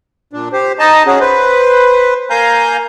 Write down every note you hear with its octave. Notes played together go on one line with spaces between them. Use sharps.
A#2 D4
G4 C5
D#4 D#5 A5
C#4 F#4 G#4
B4 C5
A#3 F5 G#5 A#5 G6